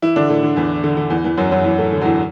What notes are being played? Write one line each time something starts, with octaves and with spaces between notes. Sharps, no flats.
E3 E4
D3 D4
A2 A3
D3
E2 E3
D3
D3
E2 E3
E2 E3
F#2 F#3
F#2 F#3
E2 E3
A2 A3
D3
F#3
E2 E3